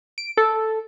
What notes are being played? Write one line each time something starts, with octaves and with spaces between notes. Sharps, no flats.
D7
A4